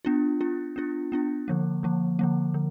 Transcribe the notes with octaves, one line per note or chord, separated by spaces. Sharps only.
B3 D4 F4
B3 D4 F4
B3 D4 F4
B3 D4 F4
D3 F3 A#3
D3 F3 A#3
D3 F3 A#3
D3